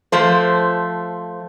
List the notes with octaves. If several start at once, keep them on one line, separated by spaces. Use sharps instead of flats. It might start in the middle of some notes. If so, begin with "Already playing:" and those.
F3 A3 C5